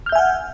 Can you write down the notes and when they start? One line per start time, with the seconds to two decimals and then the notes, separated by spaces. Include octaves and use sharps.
0.06 F6
0.09 G6
0.12 E5
0.15 G#5
0.19 F#5